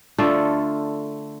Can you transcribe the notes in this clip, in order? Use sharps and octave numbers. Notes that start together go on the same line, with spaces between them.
D3 A3 F4 A4